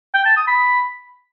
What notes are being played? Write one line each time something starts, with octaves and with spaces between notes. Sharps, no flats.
G5
A5
D#6
B5